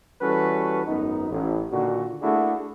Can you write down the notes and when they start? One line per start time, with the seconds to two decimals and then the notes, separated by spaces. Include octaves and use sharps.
0.22 E3 G3 C#4 F#4 A4 B4
0.87 G#1 F#2 B3 D#4
1.31 A1
1.72 A#2 D3 D#3 F#4
2.22 A3 A#3 D4 E4 F#4 G#4